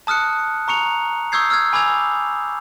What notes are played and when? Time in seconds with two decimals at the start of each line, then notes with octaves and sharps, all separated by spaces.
0.07 A5 D#6 F6 F#6 C#7
0.68 A#5 C#6 C#7 F7
1.32 C#6 D#6 E6 G6 G#6 C7
1.50 E6 F6 G#6
1.73 G#5 B5 D6 E6 G#6 F7